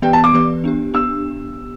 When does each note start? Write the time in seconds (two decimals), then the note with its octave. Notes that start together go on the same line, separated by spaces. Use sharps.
0.02 E3 B3 G4 B4 D5 G5
0.13 A5
0.24 D6
0.33 E3 B3 G4 B4 D5
0.64 B3 D4 G4
0.94 B3 D4 G4 E6